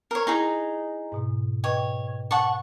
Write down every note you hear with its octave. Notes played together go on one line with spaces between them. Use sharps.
A#4 C#5
D#4 E4 G#4 A#5
G#2 B2
B4 C#5 D#5 G5
F#5 A5 C#6